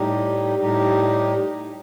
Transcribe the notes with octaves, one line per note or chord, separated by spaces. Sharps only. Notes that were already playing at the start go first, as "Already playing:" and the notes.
Already playing: A2 G3 D#4 G4
A2 G3 D#4 G4